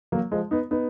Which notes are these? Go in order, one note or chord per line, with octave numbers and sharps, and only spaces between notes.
F#3 A#3
F3 G#3
B3 D#4
B3 D#4